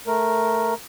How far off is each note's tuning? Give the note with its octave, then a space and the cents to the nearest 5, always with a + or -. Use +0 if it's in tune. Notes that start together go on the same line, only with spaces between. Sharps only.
A3 +0 A#4 +0